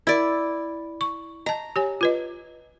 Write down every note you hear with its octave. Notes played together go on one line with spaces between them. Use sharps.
E4 A#4 D5
C#6
D#5 A5 A#5
G4 C#5 G#5
F4 B4 D#5